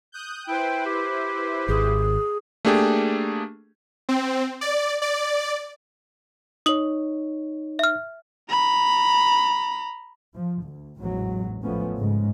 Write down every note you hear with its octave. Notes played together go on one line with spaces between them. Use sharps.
D#6 F#6 G6
E4 B4 C5 G5
G4
G#1 G#4
A3 A#3 D4 G4 G#4
C4
D5
D5
D#4 C#5 D#6 F#7
E5 F6
A#5 B5
F3
D2
A1 E2 G#2 F#3
A1 F3 A3 B3 C#4
G#2 C#3 G#3